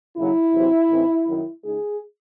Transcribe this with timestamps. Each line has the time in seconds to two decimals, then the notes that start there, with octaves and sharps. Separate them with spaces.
0.16 D#2 C#3 F#3 E4
0.54 E2 C3 F#3 C4
0.89 A2 E3 C4 D#4
1.26 F#2 D#3 F#3
1.63 C#3 G#3 D#4 G#4